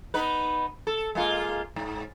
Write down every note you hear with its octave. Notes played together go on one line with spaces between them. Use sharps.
B3 D#4 B4
A4
G#3 A#3 F4
G#2